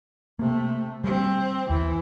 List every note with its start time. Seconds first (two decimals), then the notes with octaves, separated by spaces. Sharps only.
0.39 C3 A3 A#3
1.04 G3 C4
1.70 D#2 E3